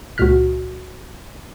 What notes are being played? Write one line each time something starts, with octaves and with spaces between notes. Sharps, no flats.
C#2 A#2 F#4 F6 B6